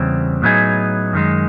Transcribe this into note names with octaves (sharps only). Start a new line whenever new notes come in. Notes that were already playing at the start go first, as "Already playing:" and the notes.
Already playing: E2 C#3 E3 G3 C4
A2 F#3 B3 D#4 G#4
F#2 D#3 G#3